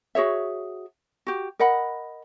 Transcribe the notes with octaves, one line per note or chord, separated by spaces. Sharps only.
F#4 G#4 C#5 E5
F#4 G4
A#4 D#5 F#5 B5